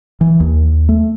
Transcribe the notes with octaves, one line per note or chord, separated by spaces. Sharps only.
E3
D#2
A3